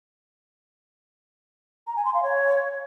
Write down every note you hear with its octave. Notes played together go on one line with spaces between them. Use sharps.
A#5
G#5
C6
F5
C#5